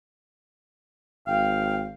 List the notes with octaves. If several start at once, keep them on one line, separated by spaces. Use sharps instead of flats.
G#1 F5 G5